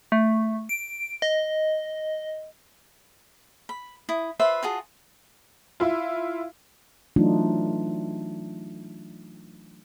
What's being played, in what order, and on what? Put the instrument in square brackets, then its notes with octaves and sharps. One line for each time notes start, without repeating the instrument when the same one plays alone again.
[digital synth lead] A3
D7
D#5
[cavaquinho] B5
E4 D#6
F4 B4 C5 E5
F4 F#4 G#4 A5
[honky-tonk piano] E4 F4
[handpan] E3 F#3 A3 D4 D#4 F4